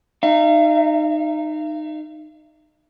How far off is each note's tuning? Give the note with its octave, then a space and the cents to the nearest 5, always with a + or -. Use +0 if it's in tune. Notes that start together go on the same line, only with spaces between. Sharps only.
D#4 -20 F5 -45